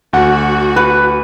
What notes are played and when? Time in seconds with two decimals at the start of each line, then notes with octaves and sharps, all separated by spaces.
0.13 D2 F#4 F#5
0.76 B4